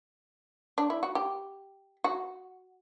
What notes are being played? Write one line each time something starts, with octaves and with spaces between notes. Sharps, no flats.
D4
E4
F#4
G4
F#4